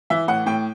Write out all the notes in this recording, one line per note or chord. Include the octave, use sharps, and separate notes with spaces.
E3 E5
A2 F#5
A2 G5